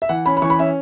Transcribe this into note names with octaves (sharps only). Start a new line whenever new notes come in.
E5
E3 F#5
C#4 B5
B5
E3 C#6
B5
C#4 E5